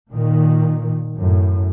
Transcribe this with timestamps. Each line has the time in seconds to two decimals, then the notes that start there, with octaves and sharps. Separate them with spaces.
0.10 A#2 D#3
1.18 F#2 A2